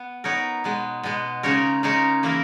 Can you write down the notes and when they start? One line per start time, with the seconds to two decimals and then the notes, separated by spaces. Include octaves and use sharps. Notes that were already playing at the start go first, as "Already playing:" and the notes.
Already playing: B3
0.24 B3 D#4 A#4 C#5
0.64 B2 G#3 B3
1.03 B2 G#3 B3
1.43 C#3 G#3 D#4 A#4 C#5
1.83 C#3 G#3 D#4 A#4 C#5
2.23 E3 A#3 E4 A#4